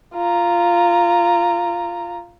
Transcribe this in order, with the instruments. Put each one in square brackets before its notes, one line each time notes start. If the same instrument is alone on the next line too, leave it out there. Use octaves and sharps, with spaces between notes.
[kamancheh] F4 A#5